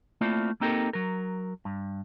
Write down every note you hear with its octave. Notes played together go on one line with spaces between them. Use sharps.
A3 A#3 C4 E4 F4 D5
A#3 C4 D#4 G4 A4 A#4
F#3 A#4
G2